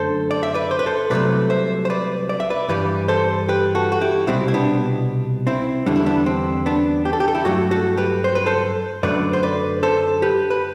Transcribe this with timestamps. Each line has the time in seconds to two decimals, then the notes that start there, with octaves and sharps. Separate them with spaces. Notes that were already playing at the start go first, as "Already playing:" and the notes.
Already playing: F#2 D3 A3 A4 C5
0.31 D5
0.43 E5
0.54 B4 D5
0.71 C5
0.79 B4
0.86 A4 C5
1.10 C2 C3 F#3 A3 B4 D5
1.50 C5 E5
1.85 C5
1.90 B4 D5
2.29 D5
2.40 E5
2.50 B4 D5
2.68 G2 E3 G3 B4 D5
3.08 A4 C5
3.49 G4 B4
3.75 F#4 A4
3.92 F#4
4.01 E4 G4
4.27 C2 B2 G3 C4 E4
4.48 E4
4.54 B3 D4
5.47 C4 E4
5.86 E2 D3 G3 D4
5.96 E4
6.06 B3 D4
6.26 C4
6.66 B3 D4
7.05 G4
7.13 A4
7.20 G4
7.28 A4
7.35 E4 G4
7.45 G2 F#3 A3 F#4 A4
7.71 F#4 A4
7.97 G4 B4
8.24 C5
8.35 B4
8.46 A4 C5
9.03 F#2 D3 F#3 A3 B4 D5
9.33 C5
9.43 B4 D5
9.83 A4 C5
10.22 G4 B4
10.50 B4